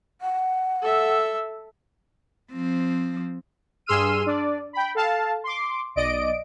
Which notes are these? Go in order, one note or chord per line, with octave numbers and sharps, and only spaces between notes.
F#5
A4 E5
F3 C4
G2 G#4 C6 E6 F6 D#7
D4 D5
G5 B5
A4 F5 A5
C6 D6
B1 D5 D#5 D7